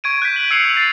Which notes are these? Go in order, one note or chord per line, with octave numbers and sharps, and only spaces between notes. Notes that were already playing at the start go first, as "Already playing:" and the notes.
C#6 G#6 D7 D#7
F#6 G6 B6
D7 F#7
E6 G#6 C7 C#7 F7
A6 C7